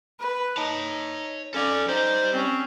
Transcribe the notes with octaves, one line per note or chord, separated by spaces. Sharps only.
B4
D#4 C#5 A5
C#4 A4 D5 F5
G3 D#4 C5 D5
C4 C#4